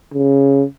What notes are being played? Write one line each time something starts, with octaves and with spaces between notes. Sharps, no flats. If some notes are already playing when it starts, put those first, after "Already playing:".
C#3